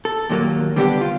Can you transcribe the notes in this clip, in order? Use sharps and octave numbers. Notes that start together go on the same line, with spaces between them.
A4
D#2 A#2 F#3 A#3
D3 G3 B3 D4 E4 G4
F4